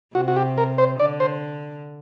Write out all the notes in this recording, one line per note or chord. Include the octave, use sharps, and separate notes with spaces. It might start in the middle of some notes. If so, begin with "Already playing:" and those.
C3 F#4
F#4
G4
A#4
C5
D3 D5
C5